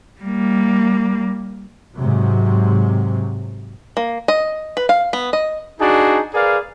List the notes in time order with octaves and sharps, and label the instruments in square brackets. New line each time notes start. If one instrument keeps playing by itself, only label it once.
[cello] G3 A#3
[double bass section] G#2 C3 F#3
[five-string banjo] A#3
D#5
B4
F5
B3
D#5
[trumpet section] D4 D#4 F#4 G#4 A5
G#4 A#4 B4 D5 F5